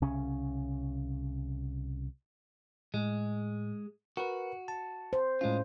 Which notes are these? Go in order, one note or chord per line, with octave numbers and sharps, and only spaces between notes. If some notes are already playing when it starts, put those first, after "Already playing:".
C2 C#3 C#4
A2 G#3
F#4 A#4 B4
A5
C5
A2 G#3 C#4 F4